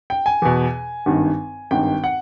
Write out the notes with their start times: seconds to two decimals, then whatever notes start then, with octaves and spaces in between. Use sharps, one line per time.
0.10 G5
0.26 G#5
0.42 E2 B2
1.06 G#1 G2 D#3
1.71 G#1 G2 D#3 G5
2.04 F#5